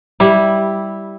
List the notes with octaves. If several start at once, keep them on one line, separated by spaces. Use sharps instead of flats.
G3 E4